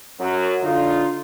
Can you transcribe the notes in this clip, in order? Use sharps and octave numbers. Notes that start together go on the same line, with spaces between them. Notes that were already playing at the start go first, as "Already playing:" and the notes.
F#2 F#3
D3 D#4 F4